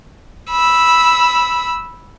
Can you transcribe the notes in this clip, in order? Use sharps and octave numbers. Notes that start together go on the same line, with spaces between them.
B5 E6